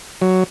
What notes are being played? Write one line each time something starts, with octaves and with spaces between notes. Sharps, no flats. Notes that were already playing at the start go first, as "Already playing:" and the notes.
F#3